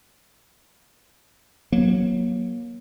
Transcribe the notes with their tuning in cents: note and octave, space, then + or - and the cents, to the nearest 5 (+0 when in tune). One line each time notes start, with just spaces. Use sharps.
F#3 +0 A#3 +25